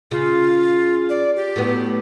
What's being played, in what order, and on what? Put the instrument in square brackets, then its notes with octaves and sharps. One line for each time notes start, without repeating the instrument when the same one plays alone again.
[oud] C#3 [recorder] F4
[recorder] D5
G4
[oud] A2 F#3 B3